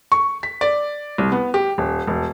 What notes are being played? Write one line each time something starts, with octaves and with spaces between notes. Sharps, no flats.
C#6
B6
D5
C2
B3
G4
D#1
E1